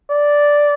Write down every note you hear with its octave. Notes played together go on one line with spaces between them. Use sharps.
D5